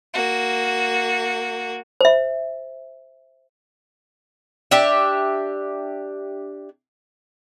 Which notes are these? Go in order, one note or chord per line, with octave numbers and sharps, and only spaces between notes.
A#3 F#4
C5 E5
D4 G4 E5